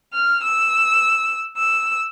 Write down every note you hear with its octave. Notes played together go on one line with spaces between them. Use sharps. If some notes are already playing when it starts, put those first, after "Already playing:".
F6
E6
E6